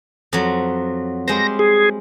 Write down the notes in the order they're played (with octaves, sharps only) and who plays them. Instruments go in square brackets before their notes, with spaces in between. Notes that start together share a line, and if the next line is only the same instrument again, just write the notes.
[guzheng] F2 F#3
[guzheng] G3 G#3 C5 [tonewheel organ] A#6
[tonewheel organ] G#4